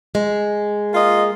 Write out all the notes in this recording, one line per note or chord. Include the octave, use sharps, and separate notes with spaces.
G#3
A#3 F4 D#5